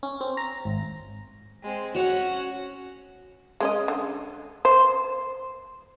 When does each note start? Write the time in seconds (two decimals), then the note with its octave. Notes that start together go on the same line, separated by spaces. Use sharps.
0.03 C#4
0.21 C4
0.37 A#5
0.65 G#1
1.63 G#3 C4
1.95 C#4 F#4 C#5 F#5
3.60 G#3 C#4 D#5
3.88 D3
4.65 C5